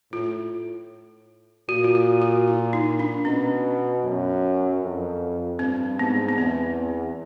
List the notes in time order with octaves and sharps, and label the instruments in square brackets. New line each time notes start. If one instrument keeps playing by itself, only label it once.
[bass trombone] A2 [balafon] F4
[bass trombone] A#2 [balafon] F#4
[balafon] F4
F#4
F#4
E4
D#4
D4
[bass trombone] B2 [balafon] C#4
[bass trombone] F#2
F2
[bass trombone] G2 [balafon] C4
[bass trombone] G#2 [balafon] B3
[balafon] B3
[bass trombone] E2 [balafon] C4